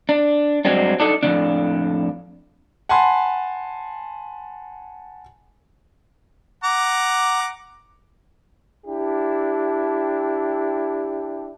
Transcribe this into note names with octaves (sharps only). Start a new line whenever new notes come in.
D4
G2 F#3 G#3 C4 D4
D4 D#4 A4
F2 A2 C#3 D4
F#5 G#5 A5 B5 C6
F#5 A#5 D6
D4 E4 G4